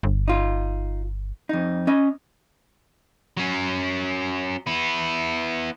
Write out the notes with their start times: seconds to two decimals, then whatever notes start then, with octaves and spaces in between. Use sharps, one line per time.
0.03 G1
0.28 D#4 F4
1.49 F2 D#4
1.87 C#4 D#5
3.37 F#3 C#4
4.67 B3 E4